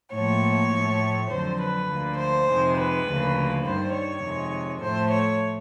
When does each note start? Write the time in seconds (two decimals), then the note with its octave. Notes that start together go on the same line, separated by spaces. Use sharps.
0.14 A2 F3 A#3 C#5
0.73 A2 F3 A3
1.31 F2 D3 F#3 C5
1.60 B4
1.89 D2 D3 F3 A#3
2.18 C5
2.48 F2 C3 D#3 G#3
2.78 B4
3.07 D2 C#3 F3 A#3
3.65 G2 D#3 G3 C5
3.94 C#5
4.23 F2 C3 D#3 G#3
4.82 A2 F3 A3 C5
5.10 C#5